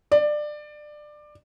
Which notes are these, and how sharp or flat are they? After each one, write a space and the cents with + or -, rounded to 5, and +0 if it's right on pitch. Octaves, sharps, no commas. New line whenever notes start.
D5 +20